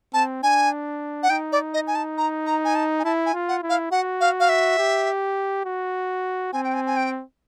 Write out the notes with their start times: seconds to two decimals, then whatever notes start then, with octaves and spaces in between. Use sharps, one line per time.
0.14 C4 A5
0.43 D4 G#5
1.23 F#5
1.30 D#4 G5
1.52 D5
1.74 D#5
1.87 G#5
1.95 A5
2.18 A#5
2.46 A#5
2.65 G#5
2.75 A5
2.99 G#5
3.04 E4 A5
3.26 G#5
3.33 F4
3.48 F#5
3.63 E4
3.69 F5
3.92 F#4 F#5
4.21 F5
4.40 F5
4.49 E5
4.79 G4
5.65 F#4
6.53 C4 G#5
6.64 G5
6.74 G#5
6.87 G#5
6.97 G5